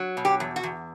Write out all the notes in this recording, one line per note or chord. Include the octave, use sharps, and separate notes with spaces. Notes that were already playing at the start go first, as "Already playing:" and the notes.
Already playing: F#3
B2
G4
E2
F#4
E2